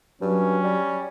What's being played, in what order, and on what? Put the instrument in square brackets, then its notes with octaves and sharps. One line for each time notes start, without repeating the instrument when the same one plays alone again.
[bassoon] G2 [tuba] F#3 [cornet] C#4
[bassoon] G3